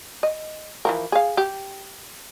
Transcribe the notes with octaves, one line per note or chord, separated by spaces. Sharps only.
D#5
E3 F3 A#4
G#4 F5
G4